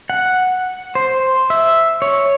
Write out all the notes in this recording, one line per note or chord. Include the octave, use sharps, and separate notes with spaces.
F#5
C5
E5
C#5